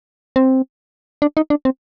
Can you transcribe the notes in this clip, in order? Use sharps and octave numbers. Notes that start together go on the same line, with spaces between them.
C4
D4
D#4
D4
C4